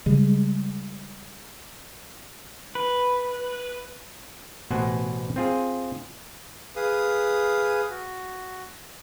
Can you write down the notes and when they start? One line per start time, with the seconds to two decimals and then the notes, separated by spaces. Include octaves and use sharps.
0.06 C#3 G3 G#3
2.75 B4
4.70 A1 B2 C5 F#5 G#5
5.36 C4 F4 G#4
6.76 G#4 B4 F5 D#6
7.90 F#4